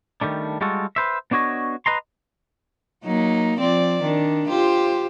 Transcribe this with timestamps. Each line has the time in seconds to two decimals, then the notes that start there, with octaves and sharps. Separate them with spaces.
0.21 D#3 G3 A3 D4
0.61 G3 G#3 F4 F#4 A4
0.96 B4 C5 E5
1.31 B3 D4 F#4 C#5 D#5
1.86 B4 D#5 A#5 C6
3.04 F#3 A#3 D#4
3.59 F3 C4 D5
4.02 D#3 D4
4.50 F4 G4 C5